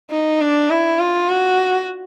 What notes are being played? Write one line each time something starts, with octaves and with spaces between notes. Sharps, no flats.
D#4
D4
E4
F4
F#4